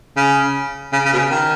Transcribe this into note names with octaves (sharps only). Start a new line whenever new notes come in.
C#3
C#3
C#3
B2
C#3
D#3